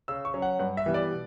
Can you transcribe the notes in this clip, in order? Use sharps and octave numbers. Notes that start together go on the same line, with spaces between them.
C#3 E6
C#6
F#3 C#4
F#5
G2 F#5
E5
E3 G3 B3
D5
B2